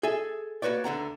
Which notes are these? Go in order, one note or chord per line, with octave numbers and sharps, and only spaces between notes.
G#4 A4 E5 G#5
A#3 F#4 B4 C#5 D5
D2 D3 F#5 A#5